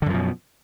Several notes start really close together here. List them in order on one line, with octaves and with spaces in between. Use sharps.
D3 F#2 F3 B2